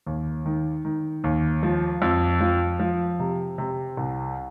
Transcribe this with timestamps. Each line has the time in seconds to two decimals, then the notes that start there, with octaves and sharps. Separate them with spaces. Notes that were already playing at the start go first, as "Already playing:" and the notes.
0.06 D#2
0.46 D#3
0.85 D#3
1.24 D#2
1.63 F3
2.02 F2
2.41 F3
2.79 F3
3.19 C3
3.58 C3
3.97 C2